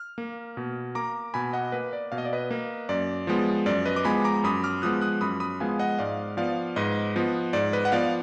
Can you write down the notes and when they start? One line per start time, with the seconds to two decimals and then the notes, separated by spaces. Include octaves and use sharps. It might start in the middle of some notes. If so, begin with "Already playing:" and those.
Already playing: F6
0.18 A#3
0.57 B2
0.95 A#3 A#5 D6
1.34 B2 G#5 B5
1.53 D#5 F#5
1.72 A#3 B4
1.93 D5
2.12 B2 F5
2.18 D#5
2.25 D5
2.33 B4 D#5
2.51 A#3
2.89 F#2 D5
3.27 F3 G#3 B3
3.66 F#2 D5
3.85 B4 D#5
3.96 D6
4.05 F3 G#3 B3 G#5 B5
4.24 A#5 D6
4.44 F#2 B5 D#6
4.64 D6 F6
4.82 F3 G#3 B3 D#6 F#6
5.02 D#6 F#6
5.21 F#2 B5 D#6
5.40 B5 D#6
5.60 F3 G#3 B3 F5 G#5
5.79 D#5 F#5
5.98 G#2 D5 F5
6.37 F3 B3 D5 F5
6.76 G#2 B4 D#5
7.16 F3 B3
7.53 G#2 D5
7.73 B4 D#5
7.85 F#5
7.92 F3 B3 D5 F5